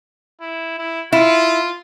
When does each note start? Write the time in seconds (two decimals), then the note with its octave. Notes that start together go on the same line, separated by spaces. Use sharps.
0.41 E4
0.78 E4
1.13 E4 F4